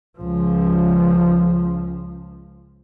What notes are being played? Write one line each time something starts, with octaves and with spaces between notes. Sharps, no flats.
C#2 F3